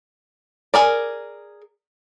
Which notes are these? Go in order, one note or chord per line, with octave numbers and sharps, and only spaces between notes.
G#4 A#4 D5